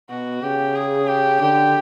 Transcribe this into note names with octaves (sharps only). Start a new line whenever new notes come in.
B2 F#4
C#3 G4
G#4
G4
D3 G4